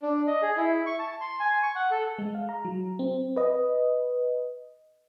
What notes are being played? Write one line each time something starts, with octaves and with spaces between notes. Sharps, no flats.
D4
D#5
G#4
E4
C#6
A5
C6
G#5
C#6
F#5
A4
G#3
F5
A#5
F#3
C4
B4 D#5